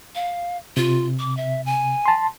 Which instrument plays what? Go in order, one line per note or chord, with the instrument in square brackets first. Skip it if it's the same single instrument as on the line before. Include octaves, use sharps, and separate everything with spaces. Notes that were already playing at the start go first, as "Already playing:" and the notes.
[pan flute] F5
[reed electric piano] C3 [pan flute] F4
[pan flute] D6
E5
G#5
[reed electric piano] A5 C6